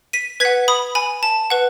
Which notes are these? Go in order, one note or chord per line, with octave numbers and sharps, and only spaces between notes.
B6 D#7
B4 F#5 G#6 B6
B5 D#6
G#5 B5
A5
B4 F#5